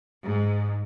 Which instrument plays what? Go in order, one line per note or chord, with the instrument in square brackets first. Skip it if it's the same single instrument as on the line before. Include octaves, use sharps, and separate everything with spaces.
[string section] G#2